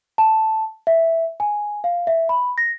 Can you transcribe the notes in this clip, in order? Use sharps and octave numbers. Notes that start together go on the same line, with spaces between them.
A5
E5
G#5
F5
E5
B5
A#6